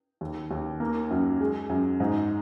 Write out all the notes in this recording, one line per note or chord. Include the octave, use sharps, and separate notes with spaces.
D#2
D#2
A#3
F#2
G#3
F#2
G#2